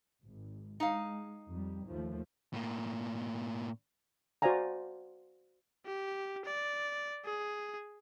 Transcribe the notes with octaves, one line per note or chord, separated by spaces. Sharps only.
G#1
G#3 D#4 F5
F2 G3
D#2 F3 A3
A2 A#3
F#4 C5 D5 F5 G#5 A#5
G4
D5
G#4